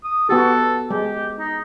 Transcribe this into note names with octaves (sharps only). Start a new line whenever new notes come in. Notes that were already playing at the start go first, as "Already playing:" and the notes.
D#6
B3 F#4 G4 A4
G#3 G4
D#4